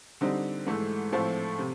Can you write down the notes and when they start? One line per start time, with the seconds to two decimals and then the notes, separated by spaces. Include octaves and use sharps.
0.21 D3 G3 C4 D#4
0.66 G#2 E3 A3
1.12 A2 F3 A3 C4
1.59 C3